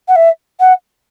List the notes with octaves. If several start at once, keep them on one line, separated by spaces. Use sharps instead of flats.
F#5
E5
F#5